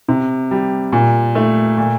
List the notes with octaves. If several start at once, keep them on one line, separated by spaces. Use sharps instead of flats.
C3
G3
A#2
A3
A#2